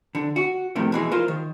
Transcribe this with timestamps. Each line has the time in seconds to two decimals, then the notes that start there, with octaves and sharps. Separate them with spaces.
0.15 D3
0.36 F#4
0.76 F2 A2 C3 D#3
0.92 B2 E3 G#3
1.12 F4 A#4 C5
1.28 D#3